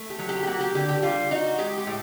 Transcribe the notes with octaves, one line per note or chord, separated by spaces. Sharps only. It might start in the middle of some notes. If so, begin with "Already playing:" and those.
Already playing: A3
G4
F#3
G4
G4
A#3 F#4
G4
D3 G4
G4
G3 F4
D#4 F#4
G#3 G4
G4
A2